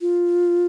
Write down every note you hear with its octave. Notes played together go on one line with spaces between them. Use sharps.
F4